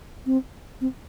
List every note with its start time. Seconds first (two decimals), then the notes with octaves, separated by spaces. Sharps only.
0.26 C4
0.81 C4